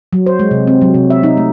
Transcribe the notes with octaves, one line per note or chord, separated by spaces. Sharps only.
F#3
C5
G#3
C3
C4
F#3
C3
E5
D#4
A3